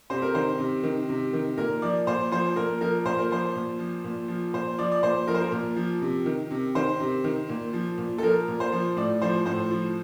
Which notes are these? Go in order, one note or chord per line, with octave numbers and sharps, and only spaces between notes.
C3 C5
A#4
D#3 C5
C3
D#3
C3
D#3
A#2 A#4
F3 D5
A#2 C5
F3 C5
A#2 A#4
F3 A#4
A#2 C5
A#4
F3 C5
A#2
F3
A#2
F3
A#2 C5
F3 D5
D5
A#2 C5
F3 A#4
C5
A#4
A#2
F3
C3
D#3
C3
D#3 C5
C3
D#3
A#2
F3
A#2
A4
F3 A#4
A#2
C5
F3
A2 D5
F3 C5
A2 C5
F3